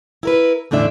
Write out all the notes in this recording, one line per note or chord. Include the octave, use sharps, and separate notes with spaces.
E4 A#4 B4
E2 A2 D3 D4 E5